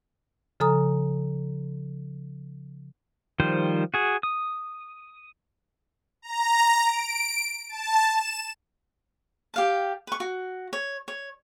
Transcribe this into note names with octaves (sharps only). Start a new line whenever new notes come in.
C#3 F3 A4 G#5 A#5 D#6
D#3 F3 G3 C5
F#4 G#4
D#6
A#5
D7
A5
E7
G4 F5 A5
B4 C#6
F#4
C#5
C#5